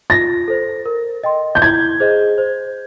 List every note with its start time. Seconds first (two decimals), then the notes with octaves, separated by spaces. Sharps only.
0.10 F4 A#6
0.48 A4 C5
0.86 A#4
1.24 D#5 G5 C6
1.55 G6
1.62 E4 G#6
2.00 G#4 C5 D#5
2.38 C5